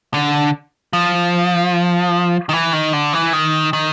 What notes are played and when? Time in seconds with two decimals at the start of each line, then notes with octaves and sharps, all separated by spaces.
0.14 D3
0.93 F3
2.49 D#3
2.53 E3
2.73 D#3
2.93 D3
3.13 E3
3.33 D#3
3.73 D#3